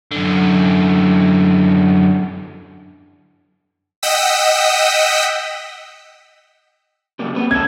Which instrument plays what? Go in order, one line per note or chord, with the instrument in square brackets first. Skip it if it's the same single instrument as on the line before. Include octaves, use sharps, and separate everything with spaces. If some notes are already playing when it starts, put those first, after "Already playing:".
[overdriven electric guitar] F#2 D3
[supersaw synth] D#5 F#5 G5 D#6 E6 B6
[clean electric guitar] C#3 G3 A#3
C4 B4
[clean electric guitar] C#4 A4 [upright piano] G#6